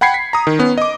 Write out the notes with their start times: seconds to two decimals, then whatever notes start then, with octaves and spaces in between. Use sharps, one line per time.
0.01 F#5 G5 B5 G#6 C7 C#7
0.14 B6
0.33 A#5 D#6
0.47 D#3
0.59 B3 C#4
0.78 D#5 D6